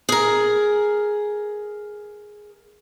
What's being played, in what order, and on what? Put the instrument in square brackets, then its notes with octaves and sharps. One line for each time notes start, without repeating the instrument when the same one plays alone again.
[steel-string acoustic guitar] G#4 A#4